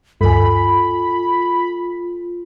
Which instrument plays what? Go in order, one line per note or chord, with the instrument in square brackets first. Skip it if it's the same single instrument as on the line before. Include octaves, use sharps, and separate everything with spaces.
[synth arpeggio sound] D2 G2 [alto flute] F4 [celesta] A4 G#5 [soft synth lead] B5